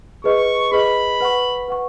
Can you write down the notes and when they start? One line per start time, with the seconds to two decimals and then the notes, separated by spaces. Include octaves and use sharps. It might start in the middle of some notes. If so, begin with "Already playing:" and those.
0.24 G#4 B4 D#5 C#6
0.72 G#4 B4 D#5 B5
1.21 B4 F#5 C#6
1.68 B4 F#5 C#6